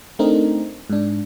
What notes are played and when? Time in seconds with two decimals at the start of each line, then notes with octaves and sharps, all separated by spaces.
0.19 A3 C4 D4 D#4 A#4
0.90 G#2 D4